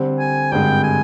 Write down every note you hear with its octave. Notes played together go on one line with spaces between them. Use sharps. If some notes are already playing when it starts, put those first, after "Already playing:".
Already playing: D3 G3 C4
G#5
G#1 G2 D3 G#3 G5
G#5